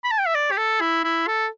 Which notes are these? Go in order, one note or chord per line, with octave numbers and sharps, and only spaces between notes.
B5
A5
G5
E5
D5
G4
A4
E4
E4
A4